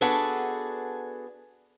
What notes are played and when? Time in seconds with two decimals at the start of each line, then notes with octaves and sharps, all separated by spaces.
0.01 B3 D4 F#4 G#4 A4